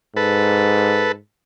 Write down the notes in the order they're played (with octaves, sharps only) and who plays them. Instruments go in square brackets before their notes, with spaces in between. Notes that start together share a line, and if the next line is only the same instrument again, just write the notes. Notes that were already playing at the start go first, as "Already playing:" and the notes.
[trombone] G#2 [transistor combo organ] A4 B4